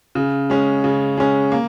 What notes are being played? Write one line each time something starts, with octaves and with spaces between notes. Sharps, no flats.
C#3
G#3 C#4
C#3
G#3 C#4
A#3